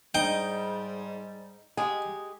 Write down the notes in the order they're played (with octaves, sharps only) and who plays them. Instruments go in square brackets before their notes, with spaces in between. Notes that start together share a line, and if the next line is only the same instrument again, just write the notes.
[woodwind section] G#2 G3 [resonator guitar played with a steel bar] D#4 [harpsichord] G5
[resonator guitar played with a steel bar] G#3 G4 [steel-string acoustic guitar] G#5